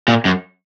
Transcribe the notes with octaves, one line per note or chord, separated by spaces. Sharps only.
A#2
F#2